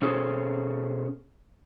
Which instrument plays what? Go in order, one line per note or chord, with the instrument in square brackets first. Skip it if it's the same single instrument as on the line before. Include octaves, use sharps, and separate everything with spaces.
[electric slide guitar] B2 C#4 G#4 A4 C5 C#5